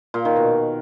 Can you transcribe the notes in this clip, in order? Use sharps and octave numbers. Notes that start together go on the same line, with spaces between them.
A#2
D#3
B2